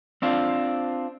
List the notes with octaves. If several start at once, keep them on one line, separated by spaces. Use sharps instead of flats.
C4 D4 F4